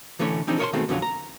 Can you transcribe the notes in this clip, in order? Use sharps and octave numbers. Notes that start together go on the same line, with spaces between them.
D3 E3 A3 C#4 C#5
E3 F3 C4 D4 D#4 G#4
A#4 C#5 D#5 G#5 A5 C6
B2 D#3 G#3 A3 C4
F2 D3 F#3 B3 C#4 F4
A#5